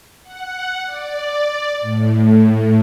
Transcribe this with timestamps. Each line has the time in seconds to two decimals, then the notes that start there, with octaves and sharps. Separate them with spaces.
0.23 F#5
0.85 D5
1.81 A2